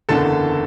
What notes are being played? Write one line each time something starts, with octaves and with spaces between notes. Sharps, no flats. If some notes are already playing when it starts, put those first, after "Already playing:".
F#1 E2 D3 A4 A5